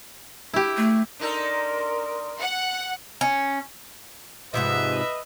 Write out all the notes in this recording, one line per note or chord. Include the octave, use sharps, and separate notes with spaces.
E4 G4
A3
D4 D#4 A4 A#4 C6
F#5
C#4
G#2 C3 F3 B4 D#5 E5